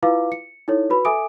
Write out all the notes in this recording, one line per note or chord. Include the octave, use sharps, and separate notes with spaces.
E4 F4 B4 F5 D6
C#7
D#4 E4 A4 C#5
F#4 B4 B5
A4 E5 G#5 D6 D#6 D7